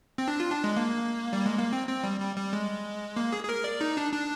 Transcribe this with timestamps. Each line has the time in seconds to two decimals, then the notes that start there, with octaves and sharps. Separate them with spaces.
0.18 C4
0.28 D4
0.40 F4
0.52 D4
0.64 G#3
0.76 A#3
1.33 G3
1.46 G#3
1.59 A#3
1.73 C4
1.89 C4
2.04 G3
2.20 G3
2.37 G3
2.53 G#3
3.16 A#3
3.32 G#4
3.44 G#4
3.49 A#4
3.64 D5
3.81 D#4
3.97 D4
4.13 D4